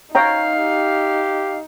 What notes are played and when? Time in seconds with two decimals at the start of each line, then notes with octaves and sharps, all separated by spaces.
0.15 D#4 C#5 F5 G5 A#5
0.58 G4